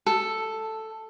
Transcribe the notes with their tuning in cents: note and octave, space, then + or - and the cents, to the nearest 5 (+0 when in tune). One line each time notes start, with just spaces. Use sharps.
A4 +5